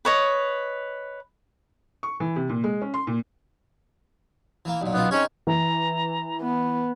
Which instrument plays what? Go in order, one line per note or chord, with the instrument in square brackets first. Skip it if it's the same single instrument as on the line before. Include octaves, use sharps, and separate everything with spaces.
[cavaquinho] B4 C#5 D#5
[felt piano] C#6
E3
C3
A#2
G#3
C#4
C6
A#2
[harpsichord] E3 A#3
B1 A#2
[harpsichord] B1 C#4 F4 [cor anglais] B3
[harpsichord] C4 D#4 G#4 [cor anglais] C#4
[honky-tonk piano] E3 [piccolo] A#5
[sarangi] B3